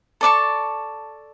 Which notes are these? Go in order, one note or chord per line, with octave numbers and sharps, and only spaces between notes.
A4 D5 A5 C#6